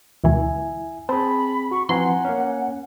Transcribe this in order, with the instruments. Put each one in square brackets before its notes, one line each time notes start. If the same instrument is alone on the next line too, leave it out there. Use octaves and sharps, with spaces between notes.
[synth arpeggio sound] D2 B2 E3 [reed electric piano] E4 E5 G#5
[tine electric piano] C4 G#4 [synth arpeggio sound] C5 [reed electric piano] A5 [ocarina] B5
[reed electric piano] F#4 [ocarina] C#6
[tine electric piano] E3 F3 C4 [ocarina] F#5 [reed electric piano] G#5 A#5 [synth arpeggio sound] C6
[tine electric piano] A#3 C#4